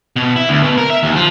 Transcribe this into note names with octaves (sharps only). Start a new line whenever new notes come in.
B2
E4
D2
B2
A#4
E5
D#2
F3